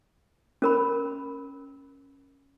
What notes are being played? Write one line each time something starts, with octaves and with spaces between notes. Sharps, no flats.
C#4 A#4 B5